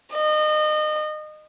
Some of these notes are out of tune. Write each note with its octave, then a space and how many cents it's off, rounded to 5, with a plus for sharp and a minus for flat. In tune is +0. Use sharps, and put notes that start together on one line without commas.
D#5 -30